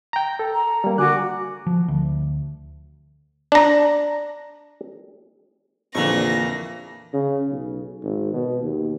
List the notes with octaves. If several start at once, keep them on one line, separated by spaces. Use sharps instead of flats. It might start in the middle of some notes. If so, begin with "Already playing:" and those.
G5 A#5
A4
A#5
G3 A#3
D3 F#4 G#5 D6 F#6
F3
D2
D4 A#5
A#1 F2 A#2 D3 E3 C#6 A#6
C#3
B1
G#1
B2
D#2